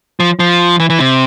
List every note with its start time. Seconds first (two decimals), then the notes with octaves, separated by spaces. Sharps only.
0.20 F3
0.39 F3
0.80 E3
0.90 E3
1.00 C3